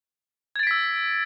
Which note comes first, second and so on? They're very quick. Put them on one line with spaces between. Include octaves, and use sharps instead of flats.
G#6 A6 D7 B6 E6